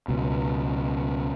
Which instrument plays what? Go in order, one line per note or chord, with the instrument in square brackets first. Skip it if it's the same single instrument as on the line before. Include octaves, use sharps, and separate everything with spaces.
[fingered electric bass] C#2 B2